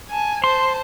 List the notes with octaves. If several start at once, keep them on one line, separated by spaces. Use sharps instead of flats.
G#5 A5
C5 A5 C6